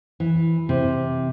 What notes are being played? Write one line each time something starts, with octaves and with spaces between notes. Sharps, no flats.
E3
C3